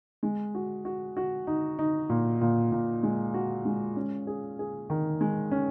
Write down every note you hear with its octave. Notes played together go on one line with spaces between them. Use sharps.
G#3
F#4
F#4
F#4
D#4
D#4
A#2
A#2
A#2
G#3
F#4
G#3
C#4
G#4
G#4
D#3
G#3
C#4